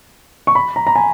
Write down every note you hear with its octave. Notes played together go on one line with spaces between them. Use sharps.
C#6
B5
A#5
A#5
G#5